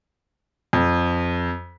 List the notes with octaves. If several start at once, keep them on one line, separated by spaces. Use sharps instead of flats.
F2